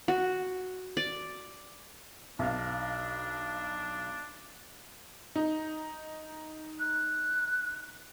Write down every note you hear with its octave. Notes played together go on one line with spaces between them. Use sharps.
F#4
D5
B1 D4 F5
D#4
F#6